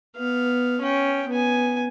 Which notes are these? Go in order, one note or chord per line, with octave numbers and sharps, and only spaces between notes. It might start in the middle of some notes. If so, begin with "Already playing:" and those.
B3 F5
C#4 G5
B3 G#5